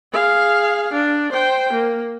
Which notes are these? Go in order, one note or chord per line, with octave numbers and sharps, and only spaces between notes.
G#4 F5
D4
C5 G5
A#3